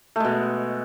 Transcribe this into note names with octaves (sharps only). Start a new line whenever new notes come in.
B2 G#3 A3